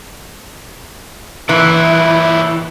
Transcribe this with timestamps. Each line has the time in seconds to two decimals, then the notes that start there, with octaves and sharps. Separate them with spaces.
1.49 A#2 E3 E4